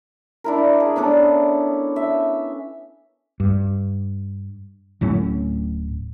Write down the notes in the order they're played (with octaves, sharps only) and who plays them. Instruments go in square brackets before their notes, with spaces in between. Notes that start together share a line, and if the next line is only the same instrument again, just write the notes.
[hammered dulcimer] D4 E4 A#4
G#4
B3 C#4 D4 A4
E5
[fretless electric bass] G2
D1 A2 F#3 C#4